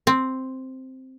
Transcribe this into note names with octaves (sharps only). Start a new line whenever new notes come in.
C4